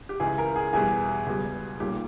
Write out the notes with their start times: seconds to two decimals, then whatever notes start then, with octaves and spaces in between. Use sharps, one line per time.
0.09 G4
0.20 C#2 C#3 E3 G#4
0.38 A#4
0.56 G#4
0.73 E2 B2 G3 G#4
1.27 C#2 B2 G3
1.80 B1 A#2 G3 G4